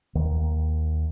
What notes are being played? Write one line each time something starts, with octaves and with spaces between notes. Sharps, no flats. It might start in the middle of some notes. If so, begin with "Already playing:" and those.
D#2 D#3